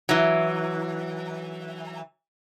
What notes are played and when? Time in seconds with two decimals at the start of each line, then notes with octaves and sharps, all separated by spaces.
0.09 E3 F#3